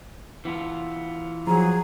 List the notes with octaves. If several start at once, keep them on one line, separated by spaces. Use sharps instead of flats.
E3 B3 F4
F3 F#3 G#4 A#5